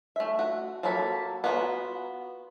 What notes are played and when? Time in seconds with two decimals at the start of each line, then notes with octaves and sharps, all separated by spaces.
0.16 A3 E5
0.39 F#4
0.83 F#3 A#3 F#4 A4 B5
1.44 B3 F4 F#4 C#5 A#5